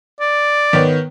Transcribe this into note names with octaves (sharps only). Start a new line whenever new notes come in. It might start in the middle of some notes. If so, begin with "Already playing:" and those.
D5
D#3 B3 C#5